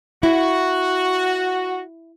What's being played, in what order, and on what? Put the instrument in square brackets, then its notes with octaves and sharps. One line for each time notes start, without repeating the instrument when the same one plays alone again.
[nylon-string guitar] E4 [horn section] F#4